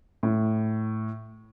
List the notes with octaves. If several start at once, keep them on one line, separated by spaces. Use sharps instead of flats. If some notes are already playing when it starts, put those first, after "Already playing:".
A2